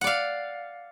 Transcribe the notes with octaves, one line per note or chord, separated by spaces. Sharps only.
D5 F5 F#5